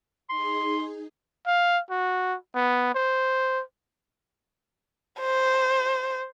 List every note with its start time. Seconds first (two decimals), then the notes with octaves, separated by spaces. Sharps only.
0.29 D#4 G#4 C6
1.46 F5
1.90 F#4
2.55 B3
2.95 C5
5.20 C5